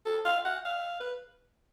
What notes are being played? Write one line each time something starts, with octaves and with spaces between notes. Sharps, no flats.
A4
F5
F#5
F5
B4